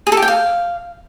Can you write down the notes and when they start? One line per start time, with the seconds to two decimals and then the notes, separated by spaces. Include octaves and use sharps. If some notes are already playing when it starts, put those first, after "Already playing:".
0.07 G#4
0.12 A4
0.17 G4
0.22 G5
0.28 F5